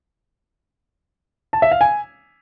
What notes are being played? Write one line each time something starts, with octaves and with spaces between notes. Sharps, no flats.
A5
E5
F5
G#5